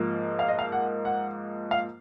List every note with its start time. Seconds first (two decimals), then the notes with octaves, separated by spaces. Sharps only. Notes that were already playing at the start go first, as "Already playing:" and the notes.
Already playing: G#2 F3 A#3
0.39 F5
0.48 D#5
0.59 F5
0.72 F#5
1.05 F#5
1.71 F5